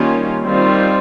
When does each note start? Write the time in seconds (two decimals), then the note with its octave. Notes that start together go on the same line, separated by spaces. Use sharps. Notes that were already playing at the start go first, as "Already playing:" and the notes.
Already playing: D#3 G3 A#3 C#4 F4
0.44 D#3 G3 C4 F4